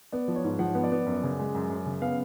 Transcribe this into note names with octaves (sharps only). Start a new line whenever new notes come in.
B3 D5
F3
C#5
G#2
F3 F#5
B3
D5
B3
F#2
C#3
G#3
F#2
F#2
C#3
B3 F5